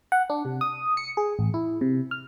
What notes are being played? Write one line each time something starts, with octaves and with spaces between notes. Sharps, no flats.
F#5
D4
C3
D#6
C#7
G#4
A1
E4
C3
F6